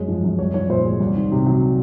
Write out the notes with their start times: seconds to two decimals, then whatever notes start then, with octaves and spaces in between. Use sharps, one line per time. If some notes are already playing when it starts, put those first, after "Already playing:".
Already playing: F#2 G#3 C#5
0.08 F3
0.24 F#2
0.39 C2 C#5
0.54 F3 C#5
0.69 A#2 C5
0.85 G#3
1.00 C2
1.15 D#3
1.32 C3
1.46 F#3